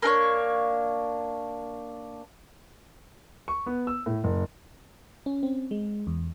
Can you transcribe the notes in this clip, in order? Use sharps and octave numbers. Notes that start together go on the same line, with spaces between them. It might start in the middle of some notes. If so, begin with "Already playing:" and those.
A#3 D4 A#4 C#5
C#6
B3
E6
A2
F#1
C#4
C4
G#3
E2